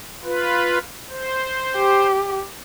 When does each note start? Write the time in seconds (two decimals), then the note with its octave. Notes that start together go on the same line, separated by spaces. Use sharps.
0.24 F4 B4
1.10 C5
1.76 G4